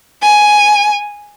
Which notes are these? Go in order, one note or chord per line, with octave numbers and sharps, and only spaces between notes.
G#5